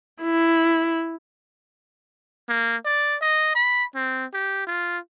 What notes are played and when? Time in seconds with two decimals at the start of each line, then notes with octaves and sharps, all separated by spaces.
0.22 E4
2.49 A#3
2.85 D5
3.21 D#5
3.55 B5
3.96 C4
4.34 G4
4.67 F4